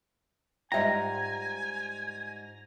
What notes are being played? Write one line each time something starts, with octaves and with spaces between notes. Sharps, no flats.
G#2 G3 F4 D#5 E5 G5 G#5 A#5